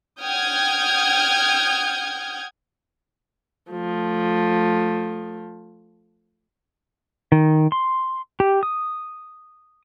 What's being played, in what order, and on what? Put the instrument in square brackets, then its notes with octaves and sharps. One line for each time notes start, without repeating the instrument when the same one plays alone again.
[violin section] F#5 G5 D#6 F6 G6 G#6
[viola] F3 A3
[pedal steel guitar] D#3
C6
G4
D#6